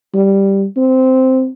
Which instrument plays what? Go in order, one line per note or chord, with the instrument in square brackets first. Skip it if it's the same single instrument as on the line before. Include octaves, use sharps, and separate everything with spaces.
[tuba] G3
C4